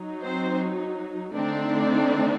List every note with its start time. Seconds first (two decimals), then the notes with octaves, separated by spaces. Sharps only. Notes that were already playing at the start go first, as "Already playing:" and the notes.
Already playing: F#3 D#4
0.23 C4 C5
1.33 D3 A3 C4 D4 D#4 D5